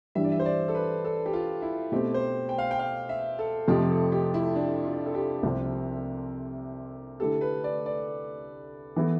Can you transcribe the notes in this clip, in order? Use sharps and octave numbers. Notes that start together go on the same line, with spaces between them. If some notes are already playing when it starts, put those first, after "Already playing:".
G2 E3 G3 D4 E5
D5
E5
C5
D5
A4
B4
A4
G4
F4
E4
B2 A3 C4 G4
C5
G5
F5
G5
F5
E5
A4
F2 C3 F3 A3 G4
A4
G4
E4
D4
F4
A4
G4
C2 C3 F3 C4
D3 A3 E4 G4 A4
B4
D5
D5
E3 B3 E4 A4